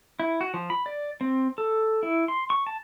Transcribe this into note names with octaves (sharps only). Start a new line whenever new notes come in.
E4
F#4
F3
B5
D5
C4
A4
E4
C6
C#6
A5